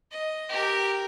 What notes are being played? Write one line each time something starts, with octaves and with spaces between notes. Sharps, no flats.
D#5
G4 A#4